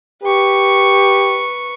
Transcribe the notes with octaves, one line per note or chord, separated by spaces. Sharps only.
G4 B4 C#6